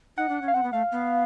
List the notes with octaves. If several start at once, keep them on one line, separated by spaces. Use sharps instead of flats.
D#4 F#5
D4
C#4
F5
C4 F#5
B3
A3 F5
B3